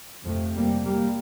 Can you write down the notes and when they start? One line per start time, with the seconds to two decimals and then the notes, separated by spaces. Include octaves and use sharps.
0.25 F2 C3 F3 A3
0.54 G3 A#3
0.84 G3 A#3